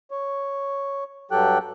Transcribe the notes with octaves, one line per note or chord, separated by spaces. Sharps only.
C#5
G2 F#3 G4 A4 G5 F#6